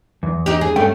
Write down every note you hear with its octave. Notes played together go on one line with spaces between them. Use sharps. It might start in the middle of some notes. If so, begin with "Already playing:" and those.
E2
D#4 G4
G#4
G2 A3 C#4 G5